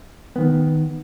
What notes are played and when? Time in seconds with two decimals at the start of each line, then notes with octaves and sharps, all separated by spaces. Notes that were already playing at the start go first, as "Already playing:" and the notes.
0.36 D#3 B3